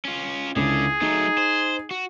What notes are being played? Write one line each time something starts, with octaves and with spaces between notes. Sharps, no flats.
C#4 F4
C#2 D3 C#4 E4 G#4
F#3 A3 D#4
C5
F#4